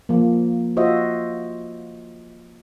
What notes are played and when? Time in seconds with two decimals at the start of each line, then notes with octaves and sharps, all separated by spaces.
0.09 F3 A#3
0.77 F4 F#4 C5 D#5 E5